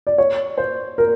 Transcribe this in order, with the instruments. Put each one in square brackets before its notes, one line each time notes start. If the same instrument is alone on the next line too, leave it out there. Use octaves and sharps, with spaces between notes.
[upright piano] D5
C#5
C5
A#4